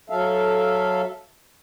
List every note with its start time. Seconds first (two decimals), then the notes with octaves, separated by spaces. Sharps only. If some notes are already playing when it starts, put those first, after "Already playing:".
0.10 F#3 A4 E5 F5